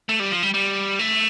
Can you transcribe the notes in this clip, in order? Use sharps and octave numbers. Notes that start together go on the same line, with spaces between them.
A3
G3
F3
G3
G3
A3